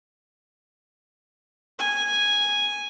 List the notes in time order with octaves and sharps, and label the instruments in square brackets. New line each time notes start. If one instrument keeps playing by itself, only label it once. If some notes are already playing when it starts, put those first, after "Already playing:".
[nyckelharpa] G#5